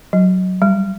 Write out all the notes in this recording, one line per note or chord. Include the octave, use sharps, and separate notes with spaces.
F#3
G3